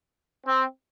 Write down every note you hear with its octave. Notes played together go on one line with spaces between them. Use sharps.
C4